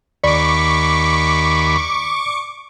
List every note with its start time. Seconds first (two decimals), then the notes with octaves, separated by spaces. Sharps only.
0.24 D#2 D5 B5 C#6 D6